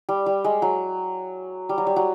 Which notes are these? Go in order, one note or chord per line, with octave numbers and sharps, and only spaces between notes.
G3
G3
G#3
F#3
G3
F#3
G3
F#3